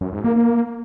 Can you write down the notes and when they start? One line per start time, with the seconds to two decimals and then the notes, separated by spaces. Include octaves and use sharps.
0.01 F#2
0.13 G#2
0.24 A#3
0.36 A#3